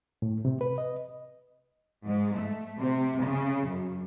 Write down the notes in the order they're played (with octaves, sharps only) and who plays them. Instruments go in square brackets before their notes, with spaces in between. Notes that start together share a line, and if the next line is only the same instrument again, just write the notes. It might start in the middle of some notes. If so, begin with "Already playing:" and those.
[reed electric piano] A2
C3
B4
D#5
[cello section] G#2
A3
C3
C#3
F#2